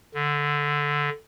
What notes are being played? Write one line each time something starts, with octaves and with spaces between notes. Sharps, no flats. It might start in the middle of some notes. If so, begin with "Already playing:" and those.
D3